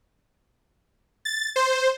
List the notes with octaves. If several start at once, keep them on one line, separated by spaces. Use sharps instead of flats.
A6
C5